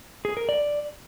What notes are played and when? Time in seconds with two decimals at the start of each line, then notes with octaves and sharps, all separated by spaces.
0.25 G#4
0.37 A#4
0.49 D5